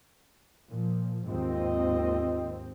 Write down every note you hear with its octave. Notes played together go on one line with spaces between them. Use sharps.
A#2 F3
D#2 G#2 C4 F4 D#5